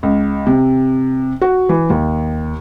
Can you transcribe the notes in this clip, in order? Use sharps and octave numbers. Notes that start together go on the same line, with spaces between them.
C#2
C3
F#4
E3
D#2